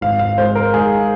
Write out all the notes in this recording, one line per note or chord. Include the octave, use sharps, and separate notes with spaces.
G#1 F5
F5
G#3 C5
A#4
G#2 G#4